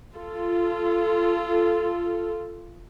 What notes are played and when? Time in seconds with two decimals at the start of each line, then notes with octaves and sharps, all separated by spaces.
0.16 F4 A4